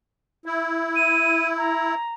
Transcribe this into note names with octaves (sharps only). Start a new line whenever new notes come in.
E4
D#7
A#5